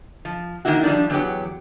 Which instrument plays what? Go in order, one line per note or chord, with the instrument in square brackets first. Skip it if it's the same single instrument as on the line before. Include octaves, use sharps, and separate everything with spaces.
[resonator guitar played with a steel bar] F3
D#3 G3 A#3 E4 F#4
F3 G3 D4
E2 F#3 G4